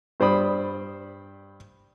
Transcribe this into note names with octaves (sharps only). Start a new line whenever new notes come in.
G2 C5 D5 B5 D#6